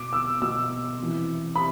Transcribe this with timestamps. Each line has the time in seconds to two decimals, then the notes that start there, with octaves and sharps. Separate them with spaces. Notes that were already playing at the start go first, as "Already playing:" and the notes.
Already playing: B2 D6
0.13 E6
0.42 B2 E6
0.99 C3 E3
1.55 C3 B5